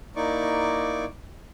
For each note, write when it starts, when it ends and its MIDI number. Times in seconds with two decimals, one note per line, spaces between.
0.16 1.05 58
0.16 1.05 63
0.16 1.05 64
0.16 1.05 74
0.16 1.05 85
0.16 1.05 86